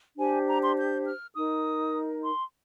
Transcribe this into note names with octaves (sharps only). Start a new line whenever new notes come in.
D4 G4 C5 G#5
A#5
C6
G6
F6
D#4 A#4 D#6
C6